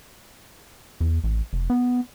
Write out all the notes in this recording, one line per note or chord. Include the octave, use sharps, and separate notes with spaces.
E2
A1
F1
B3